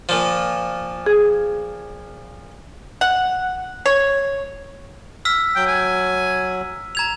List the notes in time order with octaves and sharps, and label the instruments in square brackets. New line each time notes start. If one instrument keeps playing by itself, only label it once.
[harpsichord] A#2 F3
[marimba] G#4
[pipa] F#5
C#5
[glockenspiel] E6 F6 B6
[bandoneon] F#3 [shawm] G5
[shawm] G#5
[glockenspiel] A#5 G#6 F7